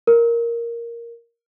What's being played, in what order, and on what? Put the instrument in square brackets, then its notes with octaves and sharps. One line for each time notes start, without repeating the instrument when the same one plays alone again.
[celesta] A#4